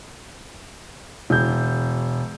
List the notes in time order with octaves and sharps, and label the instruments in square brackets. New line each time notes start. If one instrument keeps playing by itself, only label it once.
[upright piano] E1 G6